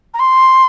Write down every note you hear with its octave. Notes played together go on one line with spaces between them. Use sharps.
A#5
C6